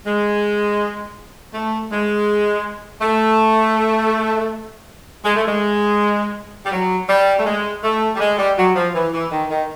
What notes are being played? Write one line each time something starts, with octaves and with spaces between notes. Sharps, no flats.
G#3
A3
G#3
A3
G#3
A3
G#3
G3
F#3
G3
A3
G#3
A3
G3
G#3
G3
F#3
F3
E3
E3
D#3
D#3